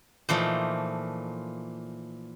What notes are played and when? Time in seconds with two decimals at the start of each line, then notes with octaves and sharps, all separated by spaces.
0.29 A#2 E3 F3 A3 D#4